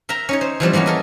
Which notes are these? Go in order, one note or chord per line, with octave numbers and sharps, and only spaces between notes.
A#4 E5 G5 A#5
C#4 D#4 C#5
C5
E3 F3 G3 C4
E3 G#3 A#3 B3 C#4
A4 A#4 D#5